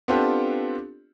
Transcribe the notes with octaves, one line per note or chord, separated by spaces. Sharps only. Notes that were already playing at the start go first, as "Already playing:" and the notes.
B3 C4 D4 F4 G4 A4